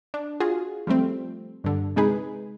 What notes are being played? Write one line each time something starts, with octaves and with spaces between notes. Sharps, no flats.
D4
F4 F#4 G#4
F3 G3 A3 C4
G2 D3
C3 G#3 D#4 G#4 B4